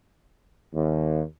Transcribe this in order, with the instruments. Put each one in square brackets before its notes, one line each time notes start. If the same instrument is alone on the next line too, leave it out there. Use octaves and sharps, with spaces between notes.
[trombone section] D#2